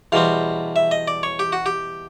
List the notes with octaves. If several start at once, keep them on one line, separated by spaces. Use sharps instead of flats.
E2 B2 G3 C4 F5
E5
D#5
D5
C#5
G4
F#4
G4